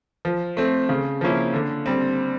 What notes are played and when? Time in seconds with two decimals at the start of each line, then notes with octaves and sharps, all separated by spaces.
0.25 F3
0.57 A3 C4
0.89 C#3
1.21 F3 A#3 C#4 E4
1.54 D3
1.86 G3 C4